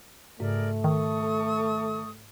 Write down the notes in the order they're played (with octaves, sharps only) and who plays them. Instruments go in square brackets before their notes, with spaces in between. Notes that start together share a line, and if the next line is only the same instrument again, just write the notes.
[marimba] G#2 C#3 [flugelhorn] A3 [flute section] G#4 A#4 D5
[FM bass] D#3 [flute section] A4 C#6 D#6